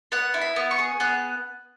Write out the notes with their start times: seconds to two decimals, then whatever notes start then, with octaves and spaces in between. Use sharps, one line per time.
0.12 B3 F#5
0.34 E4
0.41 B5
0.56 B3
0.71 C#6
0.78 G#4
1.00 B3 F#6